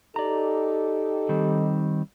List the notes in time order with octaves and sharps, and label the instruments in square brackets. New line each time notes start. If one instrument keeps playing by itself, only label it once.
[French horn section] D#4 G4 A4 [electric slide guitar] D5 A#5
[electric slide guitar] D#3 G3 C4